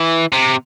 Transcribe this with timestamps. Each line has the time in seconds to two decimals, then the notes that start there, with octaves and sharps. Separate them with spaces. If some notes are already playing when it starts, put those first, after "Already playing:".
Already playing: E3
0.33 C3